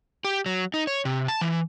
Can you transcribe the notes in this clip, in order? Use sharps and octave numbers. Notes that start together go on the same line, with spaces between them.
G4
F#3
D#4
C#5
C3
A5
E3